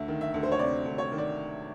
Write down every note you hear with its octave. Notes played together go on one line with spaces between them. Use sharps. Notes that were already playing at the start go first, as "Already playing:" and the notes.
Already playing: D2 E5
D#3
E5
D2
C5
C#5
C3 D5
D2
C#5
D#3
D5